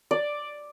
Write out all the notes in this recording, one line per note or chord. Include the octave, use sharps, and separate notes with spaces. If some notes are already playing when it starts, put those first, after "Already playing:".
D5